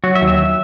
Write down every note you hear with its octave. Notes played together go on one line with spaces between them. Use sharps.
F#3 F#4
E5
D#2
E5